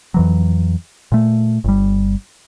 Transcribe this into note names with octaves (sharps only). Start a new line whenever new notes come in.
F2 E3 F#3
A#2 A3
G1 G3